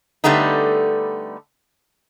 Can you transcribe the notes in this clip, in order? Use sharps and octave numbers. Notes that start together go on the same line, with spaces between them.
D3 G3 A3 B3 D#4